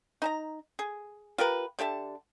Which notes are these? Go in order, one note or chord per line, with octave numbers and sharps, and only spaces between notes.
D#4 A5 A#5
G#4
F4 G4 A#4 B4
D3 G4 E5 A5